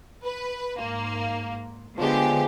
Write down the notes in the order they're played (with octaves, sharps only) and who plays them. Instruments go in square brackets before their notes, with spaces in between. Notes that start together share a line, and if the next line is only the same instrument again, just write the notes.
[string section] B4
[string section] G#2 A#3 [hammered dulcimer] C6
[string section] D3 B3 G4 [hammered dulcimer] F3 G#3